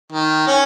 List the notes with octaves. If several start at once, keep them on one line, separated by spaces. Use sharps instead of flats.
D#3
C#4